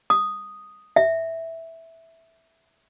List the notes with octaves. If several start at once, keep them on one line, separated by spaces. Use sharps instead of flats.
D#6
E5